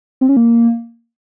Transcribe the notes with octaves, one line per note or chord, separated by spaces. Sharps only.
C4
C#4
A#3